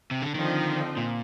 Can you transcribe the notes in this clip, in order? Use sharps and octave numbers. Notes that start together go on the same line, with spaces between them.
C3
D3
D3 D#3 F3 C4 D#4
A#2